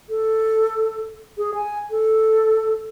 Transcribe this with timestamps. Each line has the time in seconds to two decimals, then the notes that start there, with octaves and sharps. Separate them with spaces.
0.09 A4
1.38 G#4
1.55 G#5
1.91 A4